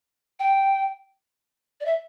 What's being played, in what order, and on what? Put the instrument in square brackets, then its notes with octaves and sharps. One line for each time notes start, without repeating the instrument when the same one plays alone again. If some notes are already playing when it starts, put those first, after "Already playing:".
[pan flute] G5
D5
E5